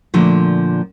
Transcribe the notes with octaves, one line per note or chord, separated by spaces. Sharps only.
A#2 D3 F3 A3